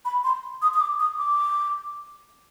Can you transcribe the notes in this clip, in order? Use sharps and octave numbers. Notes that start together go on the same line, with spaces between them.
B5
C6
D#6
D#6
D6
D#6
D6